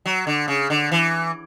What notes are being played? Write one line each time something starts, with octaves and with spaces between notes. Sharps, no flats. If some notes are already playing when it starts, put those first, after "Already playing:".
F#3
D3
C#3
D3
E3